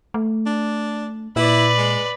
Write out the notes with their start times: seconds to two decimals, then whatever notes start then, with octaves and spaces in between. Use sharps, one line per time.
0.14 A3
0.46 D4
1.36 A#2 E4 B4 D5
1.78 G#3